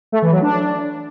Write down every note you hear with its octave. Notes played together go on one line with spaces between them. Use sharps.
A3
E3
F#3
D4